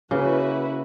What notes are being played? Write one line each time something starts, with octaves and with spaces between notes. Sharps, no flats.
C#3 A#3 E4 F#4 B4